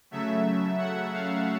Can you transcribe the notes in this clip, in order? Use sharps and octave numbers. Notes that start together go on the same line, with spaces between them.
C#3 F#3 A3 E5
F#5
F5